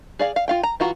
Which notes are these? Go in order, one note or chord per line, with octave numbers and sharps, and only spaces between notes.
G#4 D5 F5
F5
F4 F5 G5
A#5
E3 F4 F#4 A#5